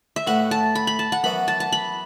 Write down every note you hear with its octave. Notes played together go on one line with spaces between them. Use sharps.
E5
A2 A3 F#4 B4 F#5
A5
B5
B5
A5
F#5
F#2 E3 B3 F#4 B4 B5
A5
A5
B5